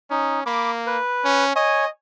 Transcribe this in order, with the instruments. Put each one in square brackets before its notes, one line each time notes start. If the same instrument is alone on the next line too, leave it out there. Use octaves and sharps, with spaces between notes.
[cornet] C#4 [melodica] D#4
[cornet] A#3 [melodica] B5 D6
[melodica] B4
[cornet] C#4
[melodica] C#5 G#5 [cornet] D#5